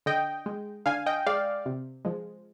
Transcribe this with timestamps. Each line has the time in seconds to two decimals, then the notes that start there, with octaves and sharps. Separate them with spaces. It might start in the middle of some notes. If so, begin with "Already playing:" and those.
0.06 D3 D#5 G5
0.46 G#3
0.86 D3 F5 G#5
1.06 D#5 G5
1.26 G#3 D5 F5
1.66 C3
2.05 F3 G#3